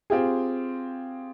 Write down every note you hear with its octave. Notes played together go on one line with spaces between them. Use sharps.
C4 F4 G4 G#4